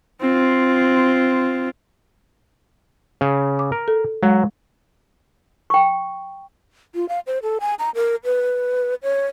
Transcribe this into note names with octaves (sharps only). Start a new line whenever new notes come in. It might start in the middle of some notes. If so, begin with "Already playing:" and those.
C4 F4
C#3
D6
A#4
A4
F#3 G#3
G5 C#6
F4
F5
C5
A4
G#5
A#5
A#4
B4
C#5